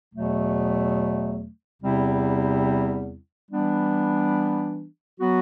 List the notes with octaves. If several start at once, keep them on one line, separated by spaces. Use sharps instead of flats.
E2 B2 F#3 A3
E2 C3 G3 C4 E4
E3 G3 B3 D4
F#3 B3 F#4